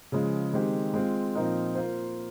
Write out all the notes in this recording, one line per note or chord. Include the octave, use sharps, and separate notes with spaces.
C#3 F3 G#3
D#3 G#3 C4 G4
G#3 C4 F4
A#2 F3 C4 D#4 A#4
A#3 F4 C5